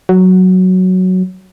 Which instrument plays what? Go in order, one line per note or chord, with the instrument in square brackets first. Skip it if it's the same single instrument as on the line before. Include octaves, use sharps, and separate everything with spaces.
[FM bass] F#3